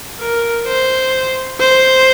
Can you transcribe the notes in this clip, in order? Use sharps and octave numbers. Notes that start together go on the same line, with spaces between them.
A#4
C5
C5